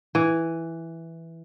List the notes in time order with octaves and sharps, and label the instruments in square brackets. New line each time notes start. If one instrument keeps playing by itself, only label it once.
[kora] E3